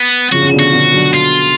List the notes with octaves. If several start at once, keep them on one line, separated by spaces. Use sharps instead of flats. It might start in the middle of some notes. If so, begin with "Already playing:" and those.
Already playing: B3
C#3 F3 F#4
C#3
B2 D3
F#4
B2 D3
D3 F#3
F4